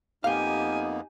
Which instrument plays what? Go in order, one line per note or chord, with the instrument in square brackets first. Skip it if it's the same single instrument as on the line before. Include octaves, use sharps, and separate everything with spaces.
[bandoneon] F2 A#3 B3 [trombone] D#4 [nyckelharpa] G4 G#5 [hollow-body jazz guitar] F5 G5